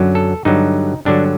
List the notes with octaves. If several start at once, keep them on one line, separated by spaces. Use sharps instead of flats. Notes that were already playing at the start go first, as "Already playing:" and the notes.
Already playing: F#2 D3 F#3
A4
G2 D3 F#3 D#4
G2 D3 F#3 D4